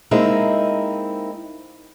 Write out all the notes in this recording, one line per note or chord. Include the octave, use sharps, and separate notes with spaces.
G#3 A#3 C4 D#4 E4